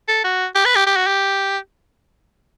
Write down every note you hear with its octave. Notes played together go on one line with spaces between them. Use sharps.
A4
F#4
G4
B4
G4
G4
F#4
G4